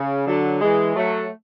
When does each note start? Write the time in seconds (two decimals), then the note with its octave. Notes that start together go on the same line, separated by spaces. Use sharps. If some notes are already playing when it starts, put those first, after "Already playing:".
Already playing: C#3
0.26 D3 F#3
0.61 E3 G#3
0.95 F#3 A3